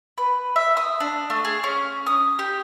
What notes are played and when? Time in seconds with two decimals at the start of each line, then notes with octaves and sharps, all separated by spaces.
0.18 B4
0.56 E5
0.77 D#6
1.00 D4
1.30 A3
1.45 G#4
1.64 C#4
2.07 D#6
2.39 G4